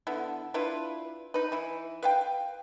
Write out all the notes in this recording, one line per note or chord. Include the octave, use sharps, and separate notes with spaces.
D3 B3 E4
D4 E4 F4 B4
D#4 B4
E3 E4
B4 F5 G5